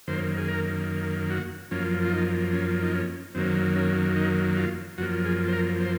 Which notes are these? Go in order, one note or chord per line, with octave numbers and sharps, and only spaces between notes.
F#2 D#3 A#3 C5
G#4
A#4
F#4
F#2 F3 A#3 C#4
F4
D#4
C#4
D#4
C#4
F#2 D#3 F#3 A#3 C4
C#4
D#4
F4
F#2 F3 A#3 F#4
G#4
C5
A#4
C5